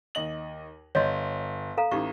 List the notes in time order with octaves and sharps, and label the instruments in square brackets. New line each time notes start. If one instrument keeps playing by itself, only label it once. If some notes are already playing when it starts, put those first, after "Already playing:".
[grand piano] D#2 D#5 F#7
[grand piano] G1 [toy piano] C#5 D#5 C6
[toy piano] A4 F5 A#5
[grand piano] A1 [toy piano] D#4 G4 C#6